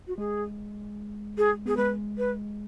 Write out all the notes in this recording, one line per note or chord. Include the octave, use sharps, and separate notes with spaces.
F#4
G#3 G#4
G#4
B3 G#4
G#3 B4
B4